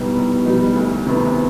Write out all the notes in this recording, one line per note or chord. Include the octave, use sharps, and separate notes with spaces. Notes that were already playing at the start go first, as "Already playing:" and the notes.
Already playing: C2 B2 G3 B3 D#4
C2
B2 G3 B3 D#4
D2
C3 D#3 B3